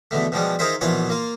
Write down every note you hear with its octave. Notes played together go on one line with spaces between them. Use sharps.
E2 B2 D3 A3
B2 F3 G3 G#3
D#4 F4 G#4 A#4 C5 E5
A#1 B2 E3 F4 C#5 F#5
A#3 F4